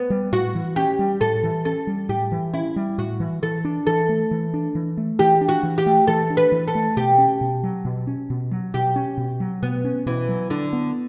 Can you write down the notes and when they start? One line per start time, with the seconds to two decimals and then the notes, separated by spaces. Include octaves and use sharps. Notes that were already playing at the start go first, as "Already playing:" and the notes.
Already playing: B3
0.10 G3
0.32 A2 F#4
0.55 E3
0.76 C#4 G4
0.99 G3
1.21 A2 A4
1.43 E3
1.65 C#4 A4
1.87 G3
2.09 A2 G4
2.32 E3
2.53 C#4 E4
2.76 G3
2.98 A2 F#4
3.20 E3
3.43 E3 A4
3.65 D4
3.87 E3 A4
4.09 A3
4.31 E3
4.54 D4
4.75 E3
4.97 A3
5.19 E3 G4
5.41 D4
5.49 F#4
5.63 E3
5.78 G4
5.86 A3
6.07 E3 A4
6.30 D4
6.37 B4
6.52 E3
6.68 A4
6.75 A3
6.97 B2 G4
7.18 C#4
7.41 B2
7.63 F#3
7.85 B2
8.07 C#4
8.30 B2
8.51 F#3
8.74 B2 G4
8.96 C#4
9.17 B2
9.40 F#3
9.62 B2 B3
9.84 C#4
10.06 B2 E3
10.28 F#3
10.50 D3 D4
10.73 B3